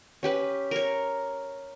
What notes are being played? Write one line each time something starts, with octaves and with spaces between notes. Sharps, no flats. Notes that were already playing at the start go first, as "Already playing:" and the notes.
C#4 G4 B4
A#4 C#5